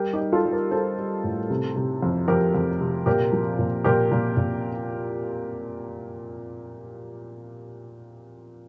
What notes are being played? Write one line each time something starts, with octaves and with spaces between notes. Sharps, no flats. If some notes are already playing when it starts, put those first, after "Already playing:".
Already playing: G3 G4 A#4
D#4 G4
G3
F4 A4
G3
G4 A#4
G3 A4 C5
G3
A2
C3
C3
F2
F2 G4 A#4
F2
C3
A#2 G4 A#4
F3
A#2
A#2 G4 A#4
A#2
A#2